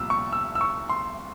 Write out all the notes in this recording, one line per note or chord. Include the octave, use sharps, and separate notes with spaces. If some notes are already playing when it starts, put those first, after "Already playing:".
Already playing: C2 A#2 F3 E6
C#6
E6
E6
C#6
C6